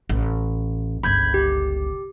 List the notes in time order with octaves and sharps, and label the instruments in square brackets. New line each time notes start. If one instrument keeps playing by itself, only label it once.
[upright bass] A1
[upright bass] G1 C#2 [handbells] B5 G6 G#6
[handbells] G4